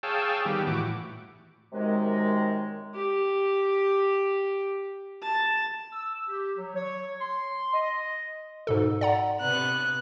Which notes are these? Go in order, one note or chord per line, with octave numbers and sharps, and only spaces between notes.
G#4 C#5 F5 G5 A5 E6
D#3 G3 B3 G4
A2 E3 F#4 D6
F#2 C3 D#3 G#3
G4
A5
E6
G4
F#3
C#5
C6
D#5
G#2 B2 A4
D5 F#5 A#5
C3 B3 F#6